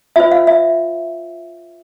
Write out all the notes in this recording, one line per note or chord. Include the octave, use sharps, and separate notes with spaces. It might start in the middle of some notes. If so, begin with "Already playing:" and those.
F4 C5 E5
F5
E5